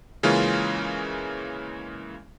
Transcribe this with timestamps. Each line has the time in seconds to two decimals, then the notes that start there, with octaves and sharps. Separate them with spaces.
0.23 C#3 E3 G#3 A#3 C#4 F4